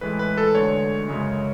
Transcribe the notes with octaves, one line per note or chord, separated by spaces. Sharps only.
A2 E3 G#3 B4
B4
A4
D2 D3 G#3 C#5
F#2 C#3 G#3